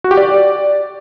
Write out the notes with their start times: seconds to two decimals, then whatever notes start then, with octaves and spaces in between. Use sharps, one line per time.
0.04 F#4
0.11 G4
0.17 D5